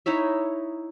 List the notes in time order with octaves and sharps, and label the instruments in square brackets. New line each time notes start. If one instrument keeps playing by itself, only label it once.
[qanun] D#4 E4 C#5 E5